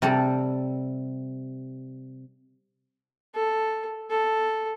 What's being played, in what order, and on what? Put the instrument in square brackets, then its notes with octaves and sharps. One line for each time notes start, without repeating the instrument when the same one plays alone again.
[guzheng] C3 G3 A4
[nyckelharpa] A4
A4